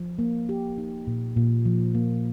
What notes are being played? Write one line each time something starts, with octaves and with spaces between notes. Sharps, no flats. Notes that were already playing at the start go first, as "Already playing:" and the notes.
Already playing: F3
A#3
G4
D#4
A#2
A#2
F3
A#3